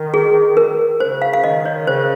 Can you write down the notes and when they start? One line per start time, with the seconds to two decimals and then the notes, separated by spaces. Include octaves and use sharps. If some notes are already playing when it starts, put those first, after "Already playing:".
Already playing: D#3
0.14 G#4
0.57 A#4
1.00 C#3 C5
1.22 F5
1.33 F5
1.44 D#3 D#5
1.65 C#5
1.87 C#3 C5